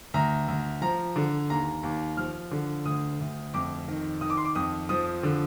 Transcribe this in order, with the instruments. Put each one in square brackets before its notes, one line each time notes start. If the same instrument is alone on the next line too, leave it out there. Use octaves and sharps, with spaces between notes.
[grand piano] D2 A#5
D2
F3 A#5
D3
D#2 A#5
D#2
F3 F6
D3
D2 D#6
D2
F2 D6
D#3
D#3 D#6
D6
C6
D6
F2 D#6
F3 D#6
D3